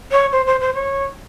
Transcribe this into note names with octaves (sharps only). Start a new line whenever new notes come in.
C#5
C5
C5
C5
C#5